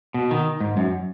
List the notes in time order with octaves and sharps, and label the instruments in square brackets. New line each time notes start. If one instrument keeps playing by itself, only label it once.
[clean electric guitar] B2
D#3
G#2
F#2